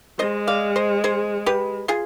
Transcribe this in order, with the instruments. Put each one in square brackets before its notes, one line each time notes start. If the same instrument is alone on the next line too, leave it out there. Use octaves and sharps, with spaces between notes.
[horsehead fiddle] G#3 [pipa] C5 D#5
[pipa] D5 F5
C5 D#5
G#4 C5
G4 B4
F4 G#4